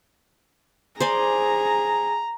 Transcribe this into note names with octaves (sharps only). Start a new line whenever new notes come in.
G#4 C5 D5 G#5 A#5